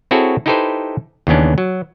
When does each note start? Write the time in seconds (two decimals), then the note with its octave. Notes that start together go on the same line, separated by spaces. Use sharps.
0.11 C4 E4 F#4 G#4 A4 C#5
0.46 D#4 E4 G4 A4 B4 C5
1.27 D#2 C#3 E3 B3 C#4 D4
1.58 F#3